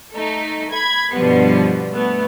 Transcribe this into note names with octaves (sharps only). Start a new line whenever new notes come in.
A3 D#4 A4
B5 G#6
G2 B2 D3 F3 G3 B3
A3 B3